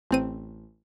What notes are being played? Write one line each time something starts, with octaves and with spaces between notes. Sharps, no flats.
A1 C4 D#7